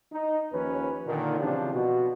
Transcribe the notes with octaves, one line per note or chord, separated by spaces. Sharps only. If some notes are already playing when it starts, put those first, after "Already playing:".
D#4
D#2 F3 C#4 B4
A#2 D3 D#3
C#3 E3 F3 C4 D4 G4
B2 F#4